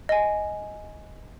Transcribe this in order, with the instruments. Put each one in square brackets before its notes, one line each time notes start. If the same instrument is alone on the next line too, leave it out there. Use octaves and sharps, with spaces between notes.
[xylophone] D#5 G#5